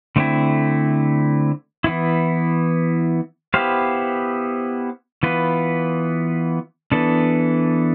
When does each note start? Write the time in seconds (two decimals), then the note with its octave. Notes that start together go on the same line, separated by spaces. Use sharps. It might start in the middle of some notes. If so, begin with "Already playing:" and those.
0.16 D3 A3 C4 E4
1.84 E3 B3 E4
3.54 B3 E4 G4 C5 F5
5.23 E3 B3 F4 B4
6.92 E3 B3 D4 A4